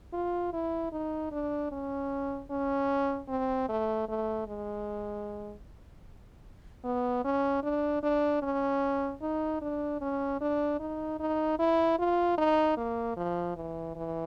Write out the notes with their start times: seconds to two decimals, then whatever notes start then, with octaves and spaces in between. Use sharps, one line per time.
0.13 F4
0.53 E4
0.92 D#4
1.31 D4
1.72 C#4
2.50 C#4
3.28 C4
3.69 A3
4.08 A3
4.47 G#3
6.84 B3
7.24 C#4
7.63 D4
8.03 D4
8.42 C#4
9.22 D#4
9.61 D4
10.01 C#4
10.41 D4
10.80 D#4
11.20 D#4
11.59 E4
11.99 F4
12.38 D#4
12.77 A#3
13.17 F3
13.56 E3
13.96 E3